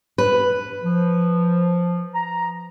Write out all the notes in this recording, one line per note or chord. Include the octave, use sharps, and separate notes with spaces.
B4
F3
A#5